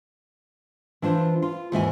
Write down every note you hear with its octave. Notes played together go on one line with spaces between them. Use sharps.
E3 D4 F4 C5
F4
D#2 G#2 E3 F#4 E5 G#5